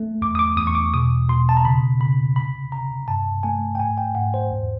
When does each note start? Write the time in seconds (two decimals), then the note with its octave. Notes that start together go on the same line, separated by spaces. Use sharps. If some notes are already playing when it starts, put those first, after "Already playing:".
Already playing: A3
0.21 E2 D6
0.35 D#6
0.39 D6
0.57 E2 D#6
0.67 C#6
0.75 D6
0.94 B2 D#6
1.29 B2 C6
1.49 A5
1.57 A#5
1.65 C#3 B5
2.00 C#3 B5
2.36 C3 B5
2.72 C3 A#5
3.08 G2 A5
3.43 A3 G#5
3.75 G5
3.80 G#2 G#5
3.98 G5
4.15 G#2 F#5
4.34 C5
4.51 E2